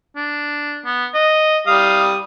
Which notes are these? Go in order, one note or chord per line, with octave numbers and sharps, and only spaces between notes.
D4
B3
D#5
G3 F5 D#6